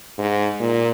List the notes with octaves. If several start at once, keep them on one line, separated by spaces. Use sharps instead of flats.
G#2
A#2